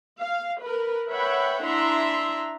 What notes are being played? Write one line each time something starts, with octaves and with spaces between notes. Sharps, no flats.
F5
A#4 B4
B4 C#5 E5 F#5 G5 B5
D4 E4 E5 A#5 C6